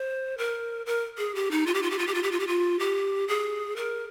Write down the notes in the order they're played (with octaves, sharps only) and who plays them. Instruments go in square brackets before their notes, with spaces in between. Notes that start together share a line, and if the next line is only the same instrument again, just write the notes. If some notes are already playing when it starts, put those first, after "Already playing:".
Already playing: [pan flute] C5
A#4
A#4
G#4
G4
D#4
F4
G4
F4
G4
F4
G4
F4
G4
F4
G4
F4
G4
G#4
A#4